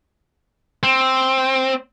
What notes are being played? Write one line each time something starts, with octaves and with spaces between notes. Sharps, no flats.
C4